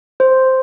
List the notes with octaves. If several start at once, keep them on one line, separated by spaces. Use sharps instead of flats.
C5